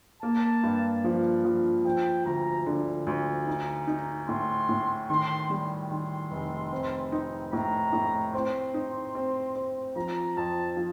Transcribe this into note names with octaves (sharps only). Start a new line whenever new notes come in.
A#3 A5
G2
F3
F3
F3 G5
D2 A#5
D3
D2
D#4 A#5
D#4
A2 C6
A2
D#3 C6
G3
D#3 C6
F1
C4
D#4
A2 A#5
A2
C4 C6
D#4
C4
C4
F3 A#5
F2 A5
F3